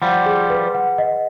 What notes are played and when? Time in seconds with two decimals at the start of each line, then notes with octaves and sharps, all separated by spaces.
0.02 F3 G3 F#5
0.26 G#4
0.50 B4
0.75 F#5
0.98 D#5